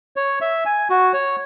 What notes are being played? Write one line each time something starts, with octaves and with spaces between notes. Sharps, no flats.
C#5
E5
G#5
F#4
C#5